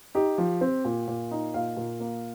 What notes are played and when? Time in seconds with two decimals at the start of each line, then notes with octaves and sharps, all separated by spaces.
0.15 D#4 G4
0.38 F3
0.61 C4
0.85 A#2
1.08 A#2
1.31 D#4
1.54 A#2 F5
1.77 A#2
2.00 A#3